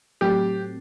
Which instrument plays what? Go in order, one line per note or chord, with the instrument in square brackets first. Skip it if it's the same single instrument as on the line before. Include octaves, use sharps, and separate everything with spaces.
[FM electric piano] A2 F#3 A3 C4 [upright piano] G4